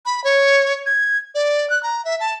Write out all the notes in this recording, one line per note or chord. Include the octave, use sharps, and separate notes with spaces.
B5
C#5
G#6
D5
F#6
A#5
E5
A5